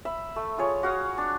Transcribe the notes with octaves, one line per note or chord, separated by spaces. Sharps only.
E5 B5
A3
F4 G#4 C#5
F#4 F5 D#6
D4